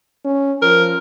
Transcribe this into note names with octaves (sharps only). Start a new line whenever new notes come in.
C#4
F3 A#4